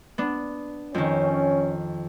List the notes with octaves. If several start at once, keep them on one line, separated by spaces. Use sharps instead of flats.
B3 D4
F2 D#3 C#4